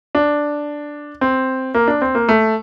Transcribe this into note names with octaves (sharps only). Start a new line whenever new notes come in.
D4
C4
A#3
D4
C4
A#3
A3